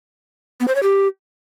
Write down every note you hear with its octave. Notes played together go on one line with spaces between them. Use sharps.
B3
C5
C#5
G4